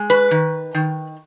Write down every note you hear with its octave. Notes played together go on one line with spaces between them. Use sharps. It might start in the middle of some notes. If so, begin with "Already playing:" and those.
Already playing: G#3
B4
D#3
D#3